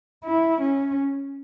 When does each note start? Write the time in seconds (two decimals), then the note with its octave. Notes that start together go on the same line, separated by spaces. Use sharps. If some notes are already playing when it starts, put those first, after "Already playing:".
0.25 E4
0.62 C#4